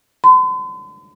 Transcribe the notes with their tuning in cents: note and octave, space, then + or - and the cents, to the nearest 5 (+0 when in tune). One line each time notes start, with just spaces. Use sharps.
C6 -45